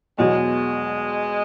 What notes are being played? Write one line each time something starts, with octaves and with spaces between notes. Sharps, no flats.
E2 B2 F#3 G#3